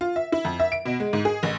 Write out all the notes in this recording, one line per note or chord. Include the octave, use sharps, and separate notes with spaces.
F4
E5
E4
F2
E5
D7
B2
G#3
G#2
G#4
A1